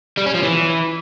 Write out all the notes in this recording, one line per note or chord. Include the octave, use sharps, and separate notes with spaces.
G3
C#4
F3
E3